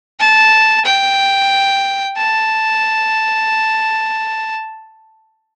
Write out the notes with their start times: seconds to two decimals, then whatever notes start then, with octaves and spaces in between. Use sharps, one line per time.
0.20 A5
0.85 G5
2.17 A5